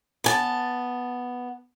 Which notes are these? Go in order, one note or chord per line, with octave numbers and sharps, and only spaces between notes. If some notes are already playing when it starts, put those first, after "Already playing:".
B3 G#5 A5